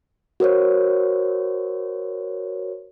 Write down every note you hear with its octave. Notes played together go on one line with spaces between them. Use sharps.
F#4 A#4 C5 C#5